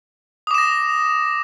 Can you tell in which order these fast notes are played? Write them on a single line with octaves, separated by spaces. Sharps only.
D#6 D6 E7 A#6